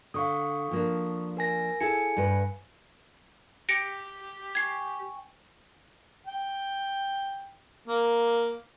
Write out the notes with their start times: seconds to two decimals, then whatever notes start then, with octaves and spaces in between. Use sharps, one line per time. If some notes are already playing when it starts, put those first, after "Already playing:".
0.14 D3 F5 C#6 D#6
0.71 F3 A#3 D4
1.37 A#4 G#5 A#6
1.81 E4 G#4 A4 G#5 C#7
2.17 G2 B4
3.69 G4 A#6 C#7 D7
4.55 G5 G#5 C#6 G#6 C7
6.27 G5
7.88 A#3